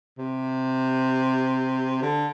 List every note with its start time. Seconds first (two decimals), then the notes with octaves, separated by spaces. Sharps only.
0.18 C3
2.02 D3